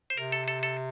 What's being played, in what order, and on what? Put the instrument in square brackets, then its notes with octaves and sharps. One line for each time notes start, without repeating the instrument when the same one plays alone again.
[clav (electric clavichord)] C5
[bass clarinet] C3 [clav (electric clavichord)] A#4
[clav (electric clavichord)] A4
A4
A4